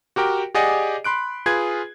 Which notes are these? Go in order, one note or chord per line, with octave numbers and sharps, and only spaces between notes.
F#4 G4 A#4 G5
G4 G#4 D5 D#5 F#5 G#5
B5 C6 F#6 D7
F4 G#4 B4 G#6